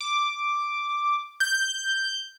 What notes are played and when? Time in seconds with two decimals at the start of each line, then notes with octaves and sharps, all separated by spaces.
0.01 D6
1.40 G6